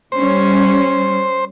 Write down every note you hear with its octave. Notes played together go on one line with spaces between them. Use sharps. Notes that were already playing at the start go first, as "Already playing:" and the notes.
G3 C#4 C5